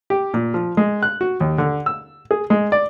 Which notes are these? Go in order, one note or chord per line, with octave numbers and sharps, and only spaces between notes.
G4
A#2
F3
G#3
F#6
F#4
D#2
D3
E6
G#4
G#3
D5